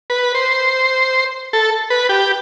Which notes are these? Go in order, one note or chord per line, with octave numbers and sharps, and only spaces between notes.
B4
C5
A4
B4
G4